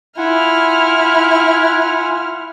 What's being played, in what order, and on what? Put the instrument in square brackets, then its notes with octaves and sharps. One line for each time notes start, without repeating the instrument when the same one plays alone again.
[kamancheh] E4 F6 [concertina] F4 F#5 G#5